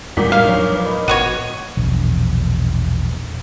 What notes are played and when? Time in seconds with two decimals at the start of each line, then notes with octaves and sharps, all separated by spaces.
0.17 E2 A#2 G3 G#3 D#4 F#4 B6
0.32 F2 A2 F5
0.45 D#1 F3 F#3 D4 C#5
0.74 B4
0.86 A#4 D#5 B5
1.08 G#1 A#2 B3 F#4 C#5 D#7
1.77 E1 A#1